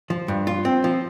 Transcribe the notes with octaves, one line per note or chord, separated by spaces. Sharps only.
F3
G2
F4
C4
F3